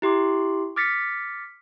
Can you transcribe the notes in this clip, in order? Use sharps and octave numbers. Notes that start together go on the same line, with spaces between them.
E4 G4 C6 D6
D6 F6 A6 B6 C#7